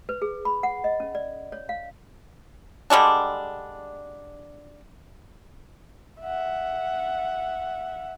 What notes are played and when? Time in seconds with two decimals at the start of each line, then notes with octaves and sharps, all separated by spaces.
0.09 B4
0.22 G#4
0.45 B5
0.63 F#5
0.84 D#5
1.00 C#4
1.15 D5
1.52 C#5
1.69 F5
2.90 D3 G3 G#3 D4
6.21 E5 F#5